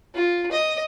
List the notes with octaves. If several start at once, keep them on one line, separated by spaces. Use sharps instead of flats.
F4
D#5